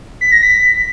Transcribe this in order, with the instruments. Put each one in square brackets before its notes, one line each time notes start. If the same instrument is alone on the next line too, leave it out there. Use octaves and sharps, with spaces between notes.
[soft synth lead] B6
A#6
B6